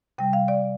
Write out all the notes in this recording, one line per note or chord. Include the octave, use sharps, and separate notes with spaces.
C3 G3 G5
F5
D5